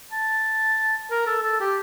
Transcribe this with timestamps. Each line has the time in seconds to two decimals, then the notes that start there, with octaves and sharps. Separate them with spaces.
0.12 A5
1.11 A#4
1.27 A4
1.43 A4
1.60 G4